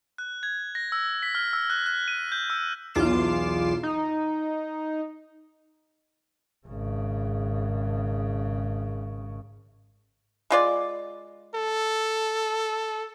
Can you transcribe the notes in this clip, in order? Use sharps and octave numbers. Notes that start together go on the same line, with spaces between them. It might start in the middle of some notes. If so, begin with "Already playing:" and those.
F#6
G#6
A#6
E6
B6
F6
E6
F#6
F#6
D#7
G6
E6
B1 E2 F4 D6 C7 E7
D#4
G#1 C#3
G#3 F4 D5
A4